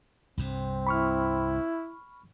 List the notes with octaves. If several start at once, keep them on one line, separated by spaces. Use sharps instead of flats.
C2 G2 C3 C4
E4 B5 C#6 F6